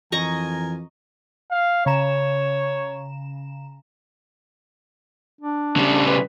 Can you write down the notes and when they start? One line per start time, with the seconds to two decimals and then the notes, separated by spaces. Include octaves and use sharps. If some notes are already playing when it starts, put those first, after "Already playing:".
0.12 F2 E3 A#4 D#5 G#5 A#5 C#6
1.51 F5
1.86 C#3 C#5 A#5 E7
5.41 D4
5.76 C#3 G3
6.07 B4